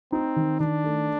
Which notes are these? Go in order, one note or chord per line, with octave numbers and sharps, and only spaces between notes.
C4 D#4
D#3
D#3 D4
A3